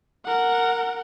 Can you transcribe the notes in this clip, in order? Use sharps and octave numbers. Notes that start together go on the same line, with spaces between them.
A#4 F#5